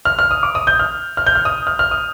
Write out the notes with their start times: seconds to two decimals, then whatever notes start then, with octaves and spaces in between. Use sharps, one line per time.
0.05 F6
0.19 F6
0.31 D#6
0.43 D6
0.55 D#6
0.67 G6
0.79 F6
1.17 F6
1.26 G6
1.35 F6
1.45 D#6
1.67 F6
1.79 F6
1.91 D#6